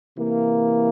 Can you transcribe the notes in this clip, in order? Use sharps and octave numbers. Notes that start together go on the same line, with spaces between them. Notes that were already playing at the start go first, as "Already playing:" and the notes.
C3 E3 A#3